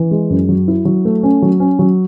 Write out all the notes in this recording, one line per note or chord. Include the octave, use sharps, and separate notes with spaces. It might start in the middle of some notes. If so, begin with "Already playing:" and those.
Already playing: E3
G#3
F#2
F#3
E4
F#3
A3
C#4
F#3
C#4
F#3